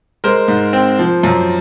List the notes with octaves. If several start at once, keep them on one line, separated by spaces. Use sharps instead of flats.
G#3 A#4 C5
G#2
C4
F3
F#2